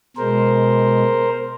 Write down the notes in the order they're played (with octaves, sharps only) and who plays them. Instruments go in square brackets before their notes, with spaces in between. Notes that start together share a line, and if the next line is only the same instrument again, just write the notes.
[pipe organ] B2 G#3 A#4 C5